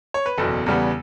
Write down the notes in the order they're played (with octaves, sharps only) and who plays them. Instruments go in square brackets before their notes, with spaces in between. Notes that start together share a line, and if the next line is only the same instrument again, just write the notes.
[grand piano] C#5
B4
F#1 E2 B2 A4
E2 C#3 G3 B3